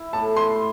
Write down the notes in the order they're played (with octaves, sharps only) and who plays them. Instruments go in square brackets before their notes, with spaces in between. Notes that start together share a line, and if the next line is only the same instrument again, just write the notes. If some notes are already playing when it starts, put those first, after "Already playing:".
Already playing: [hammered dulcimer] E4
[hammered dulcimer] A2 [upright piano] A5
[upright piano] C6